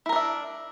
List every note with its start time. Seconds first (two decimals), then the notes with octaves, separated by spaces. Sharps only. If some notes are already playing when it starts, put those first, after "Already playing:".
0.06 E4
0.09 A#4
0.13 D4
0.16 E5